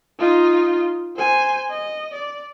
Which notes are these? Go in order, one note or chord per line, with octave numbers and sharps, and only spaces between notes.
D#4 F4
C5 G#5
D#5
D5